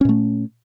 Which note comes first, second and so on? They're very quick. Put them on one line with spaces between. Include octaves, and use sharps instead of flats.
C#4 A#2 A3